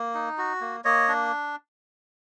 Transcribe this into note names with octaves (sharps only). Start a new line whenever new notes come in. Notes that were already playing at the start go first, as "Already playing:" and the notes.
Already playing: A#3
D#4
F#4
A#3
A#3 C#5 D#5
D4